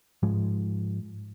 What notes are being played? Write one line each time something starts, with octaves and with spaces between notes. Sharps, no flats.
G#2 F3 G#3